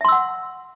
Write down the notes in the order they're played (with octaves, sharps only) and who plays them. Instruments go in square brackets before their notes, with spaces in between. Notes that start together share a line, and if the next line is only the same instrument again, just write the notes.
[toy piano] E5
C6
E6
F#5